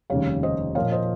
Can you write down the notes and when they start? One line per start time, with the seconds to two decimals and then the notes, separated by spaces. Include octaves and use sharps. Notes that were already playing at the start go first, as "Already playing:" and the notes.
0.10 F1 D#2 C#3 G3 C#5 F5
0.43 C5 D#5
0.75 A#2 F3 A#3 C#5 F5
0.92 C5 D#5